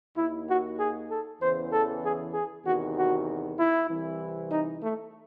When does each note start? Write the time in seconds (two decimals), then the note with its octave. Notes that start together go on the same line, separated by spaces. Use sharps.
0.17 D#2 D#3 E4
0.48 F#4
0.80 G#4
1.10 A4
1.41 E2 C#3 E3 C5
1.73 A4
2.03 G#4
2.34 G#4
2.65 E2 C3 D#3 F#4
2.96 F#4
3.59 E4
3.89 C2 C3 E3
4.52 D#4
4.82 A3